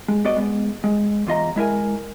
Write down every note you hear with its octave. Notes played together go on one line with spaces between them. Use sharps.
G#3
B3 F#4 D5 D#5
G#3 B3
G#3
E2 F4 D#5 A#5
G#3 E4 A#4 G#5